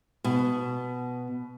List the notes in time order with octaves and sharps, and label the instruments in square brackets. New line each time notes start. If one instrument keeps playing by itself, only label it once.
[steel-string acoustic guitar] B2